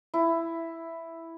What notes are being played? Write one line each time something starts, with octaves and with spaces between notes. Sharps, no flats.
E4